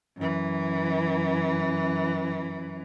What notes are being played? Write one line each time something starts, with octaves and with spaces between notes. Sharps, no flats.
F#2 E3